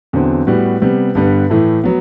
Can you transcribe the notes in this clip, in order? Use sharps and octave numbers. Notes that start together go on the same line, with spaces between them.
E2 D3 F#3 C4
A2 G3 B3 F#4
C3 G3 B3
G2 D3 G3 B3
A2 E3 A3
F#3 B3